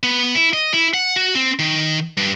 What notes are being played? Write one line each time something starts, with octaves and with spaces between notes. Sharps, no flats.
B3
E4
D#5
E4
F#5
F#4
C4
D#3
G2